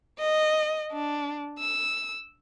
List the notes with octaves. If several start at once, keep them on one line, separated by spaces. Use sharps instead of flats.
D#5
D4
E6